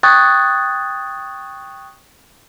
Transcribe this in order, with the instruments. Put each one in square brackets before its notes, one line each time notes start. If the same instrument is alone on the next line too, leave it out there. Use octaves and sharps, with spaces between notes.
[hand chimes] G5 C#6 D#6 F#6 G#6 A6